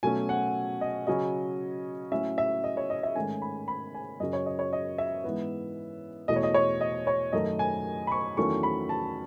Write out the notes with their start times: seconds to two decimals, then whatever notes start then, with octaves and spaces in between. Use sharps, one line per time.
0.03 B2 F#3 A3 C#4 G#5
0.29 F#5
0.81 D#5
1.07 C#3 F#3 C#4 D#5
2.12 A2 F#3 C#4 E5
2.38 E5
2.64 D#5
2.77 C#5
2.90 D#5
3.03 E5
3.15 G#2 D#3 A3 C#4 G#5
3.42 B5
3.68 B5
3.95 G#5
4.20 F#2 C#3 F#3 C#4 D#5
4.33 C#5
4.46 D#5
4.59 C#5
4.73 D#5
4.98 E5
5.24 G#2 E3 B3
6.28 E2 B2 A3 D#5
6.36 C#5
6.43 D#5
6.54 C#5
6.81 D#5
7.07 C#5
7.32 F#2 D#3 A3 D#5
7.59 G#5
8.07 B5
8.12 C#6
8.37 E2 D#3 F#3 A3 C#4 C#6
8.63 B5
8.89 A5